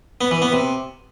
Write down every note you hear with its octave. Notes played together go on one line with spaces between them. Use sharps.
B3
E3
B3
C3